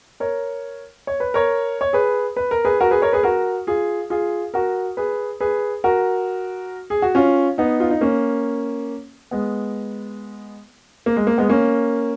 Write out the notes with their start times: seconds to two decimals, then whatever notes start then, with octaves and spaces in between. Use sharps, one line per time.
0.20 A#4 C#5
1.07 C#5
1.20 B4
1.34 A#4 C#5
1.81 C#5
1.93 G#4 B4
2.37 B4
2.51 A#4
2.65 G#4 B4
2.80 F#4 A#4
2.91 G#4 B4
3.02 A#4 C#5
3.13 G#4 B4
3.23 F#4 A#4
3.67 F4 G#4
4.10 F4 G#4
4.54 F#4 A#4
4.97 G#4 B4
5.40 G#4 B4
5.84 F#4 A#4
6.90 G#4
7.02 F#4
7.15 C#4 F4
7.58 B3 D#4
7.80 F4
7.91 D#4
8.01 A#3 C#4
9.31 G#3 B3
11.06 A#3
11.16 G#3
11.27 A#3
11.38 G#3 B3
11.49 A#3 C#4